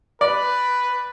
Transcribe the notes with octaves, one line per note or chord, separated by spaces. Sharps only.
B4 D5